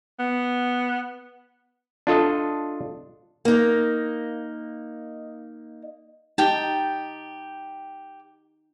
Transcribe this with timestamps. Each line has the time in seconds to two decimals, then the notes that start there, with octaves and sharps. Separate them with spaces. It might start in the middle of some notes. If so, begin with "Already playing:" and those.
0.19 B3
2.07 D4 F4 A4 D#5
3.45 A#3 D#4
6.38 D#4 G4 G5 A5